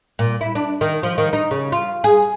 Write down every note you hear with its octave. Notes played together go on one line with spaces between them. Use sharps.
A#2
E4
D4
D#3
F3
D#3
D#4
C#3
F4
G#4